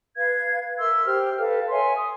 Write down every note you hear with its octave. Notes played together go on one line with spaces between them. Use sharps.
B4 F5 G#6
A#4 E5 C6 E6
G4 C5 F6
A4 B4 F5
C#5 E5 G#5 C6
D#6